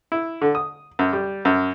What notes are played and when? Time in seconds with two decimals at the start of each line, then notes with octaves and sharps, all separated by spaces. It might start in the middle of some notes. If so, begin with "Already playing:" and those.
0.12 E4
0.41 D3
0.55 D#6
0.99 F#2
1.13 G3
1.45 F#2